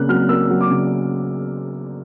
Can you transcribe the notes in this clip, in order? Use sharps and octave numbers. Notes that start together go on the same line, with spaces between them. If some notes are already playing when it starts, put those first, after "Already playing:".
Already playing: C#3 A#3 F#6
F#3 F6
A#3 E6
F#3
D6
C#3